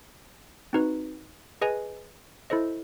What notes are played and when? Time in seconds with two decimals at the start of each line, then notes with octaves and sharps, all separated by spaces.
0.73 C4 D#4 F#4 B4
1.61 G#4 B4 D#5 G#5
2.50 E4 A4 C5 D#5